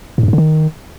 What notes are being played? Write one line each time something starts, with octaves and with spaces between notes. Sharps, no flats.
A2
G2
G#2
D3
D#3